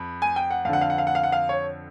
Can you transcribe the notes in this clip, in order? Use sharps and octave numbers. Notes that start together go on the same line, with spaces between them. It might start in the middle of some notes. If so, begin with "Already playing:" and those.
Already playing: F2 B5
G#5
G5
F#5
F2 D3 F5 F#5
F5
F#5
F5
F#5
F5
F#5
F5
C#5